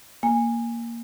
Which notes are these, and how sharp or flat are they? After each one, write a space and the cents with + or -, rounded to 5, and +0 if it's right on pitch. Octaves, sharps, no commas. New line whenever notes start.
A#3 +0 G#5 -15